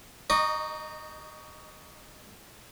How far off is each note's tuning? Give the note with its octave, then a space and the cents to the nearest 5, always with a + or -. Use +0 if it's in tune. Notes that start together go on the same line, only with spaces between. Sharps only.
D#4 +0 D#5 -25 C#6 +25